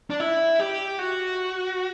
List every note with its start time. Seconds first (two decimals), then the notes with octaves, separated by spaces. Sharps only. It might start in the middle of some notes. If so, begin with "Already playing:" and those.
0.10 D4
0.20 E4
0.60 G4
0.99 F#4